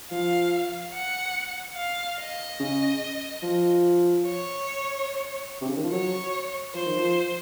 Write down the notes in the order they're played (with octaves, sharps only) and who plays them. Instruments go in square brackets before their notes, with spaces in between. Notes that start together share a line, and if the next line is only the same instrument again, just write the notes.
[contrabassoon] F3 [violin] F5
[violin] F#5
F5
D#5
[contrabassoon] C#3
F3
[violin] C#5
[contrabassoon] C3
C#3
D#3
F3
[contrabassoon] F#3 [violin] C#5
[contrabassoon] F3 [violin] C5
[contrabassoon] D#3
F3